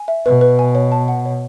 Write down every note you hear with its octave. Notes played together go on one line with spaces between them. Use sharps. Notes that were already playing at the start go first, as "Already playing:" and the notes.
Already playing: G#5
E5
B2 B4
B4
G#5
C#5
A5
F#5
C#5